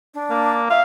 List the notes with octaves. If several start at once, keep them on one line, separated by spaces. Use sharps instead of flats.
D4
A#3
E5 F5